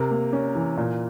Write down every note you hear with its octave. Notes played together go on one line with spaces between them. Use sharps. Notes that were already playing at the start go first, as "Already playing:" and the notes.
Already playing: C3 A#4
A#3
C#4
E3
A#2